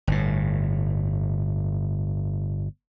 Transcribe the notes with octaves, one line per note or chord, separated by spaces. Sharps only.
G1 A2